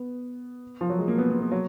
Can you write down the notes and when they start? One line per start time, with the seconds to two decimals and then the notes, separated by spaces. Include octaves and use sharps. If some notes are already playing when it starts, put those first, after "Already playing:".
Already playing: B3
0.81 F3
0.90 F#3
0.98 G#3
1.08 A#3
1.18 B3
1.30 B3
1.41 B3
1.52 F#3